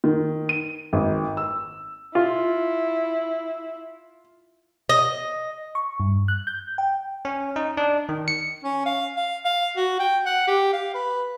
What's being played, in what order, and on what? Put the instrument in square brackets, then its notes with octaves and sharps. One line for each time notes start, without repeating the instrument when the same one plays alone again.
[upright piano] D#3
D#7
G#1
E6
[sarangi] E4 [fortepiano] F4
[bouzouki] D#5
[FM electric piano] C#6
G2
F#6
G6
G5
[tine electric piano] C#4
D#4
D4
D#3
C#7
[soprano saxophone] C#4
F5
F5
F5
F#4
G5
F#5
G4
F5
B4